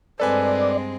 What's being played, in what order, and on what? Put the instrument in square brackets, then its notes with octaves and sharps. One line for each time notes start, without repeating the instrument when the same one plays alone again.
[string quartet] G2 G#3 C4 [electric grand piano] A4 B4 G#5 [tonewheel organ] D5